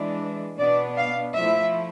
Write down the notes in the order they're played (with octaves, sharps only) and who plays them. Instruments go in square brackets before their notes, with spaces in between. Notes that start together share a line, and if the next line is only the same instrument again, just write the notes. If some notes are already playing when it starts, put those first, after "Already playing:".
Already playing: [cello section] E3 G#3 D4
B2 B3 D4 D5
F5
F3 A3 E4 E5